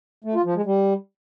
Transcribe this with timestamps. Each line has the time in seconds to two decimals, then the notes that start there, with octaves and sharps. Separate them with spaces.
0.24 A3
0.35 F4
0.45 F3
0.55 G#3
0.66 G3